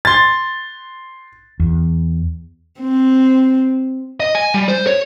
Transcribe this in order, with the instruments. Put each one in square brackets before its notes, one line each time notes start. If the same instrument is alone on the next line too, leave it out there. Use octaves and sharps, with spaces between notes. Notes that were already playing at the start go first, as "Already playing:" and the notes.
[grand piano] C6 A6
[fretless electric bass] E2
[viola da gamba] C4
[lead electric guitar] D#5
G#5
G3
C5
C#5